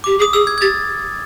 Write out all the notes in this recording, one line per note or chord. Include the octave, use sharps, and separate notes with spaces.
G4 D6
G#4
D#6
G#4 E6
G#6
G#6
G4 A6